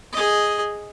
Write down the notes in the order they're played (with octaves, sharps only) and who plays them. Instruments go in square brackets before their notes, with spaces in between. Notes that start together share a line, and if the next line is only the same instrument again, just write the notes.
[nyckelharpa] G#4 D#5